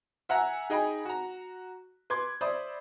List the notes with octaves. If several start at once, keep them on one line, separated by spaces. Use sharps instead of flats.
E5 F#5 G#5 A#5
D#4 G#4 D#5 G5 G#5 B5
F#4 A#5
B4 C6 D6 G#6
C5 D5 E5 B5 D#6